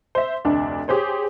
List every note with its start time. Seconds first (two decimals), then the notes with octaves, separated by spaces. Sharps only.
0.15 C5 E5
0.45 F1 D2 D3 D4
0.88 G4 G#4 C5 C#5